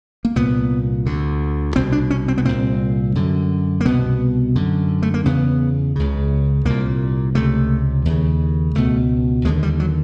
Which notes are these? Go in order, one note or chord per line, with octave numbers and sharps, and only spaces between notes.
A#3
C2 A#2 B3
D2 D3
C2 B2 C4
D4
C#4
C4
B3
C2 A#2 C4
F#2 D3
A#3
C2 B2 B3
F#2 D3
A3
A#3
E2 C#3 B3
C#2 C#3
C2 A#2 A#3
C#2 C3 A3
D#2 C#3
C#2 B2 A3
D#2 D3 G#3
G3
F#3